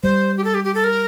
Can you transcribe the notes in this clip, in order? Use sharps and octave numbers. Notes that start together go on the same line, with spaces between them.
G3 C5
G4
A4
G4
G4
A4
A#4